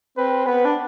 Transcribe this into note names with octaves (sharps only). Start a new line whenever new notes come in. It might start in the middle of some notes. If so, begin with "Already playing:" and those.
C4 B4
B3 B4
D4